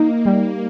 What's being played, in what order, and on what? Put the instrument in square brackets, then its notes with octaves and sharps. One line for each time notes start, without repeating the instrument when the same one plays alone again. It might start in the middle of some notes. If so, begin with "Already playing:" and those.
Already playing: [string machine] A#3 [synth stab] D#4
[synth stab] G3